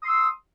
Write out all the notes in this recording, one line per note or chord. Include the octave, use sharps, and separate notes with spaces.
C6 D#6 E6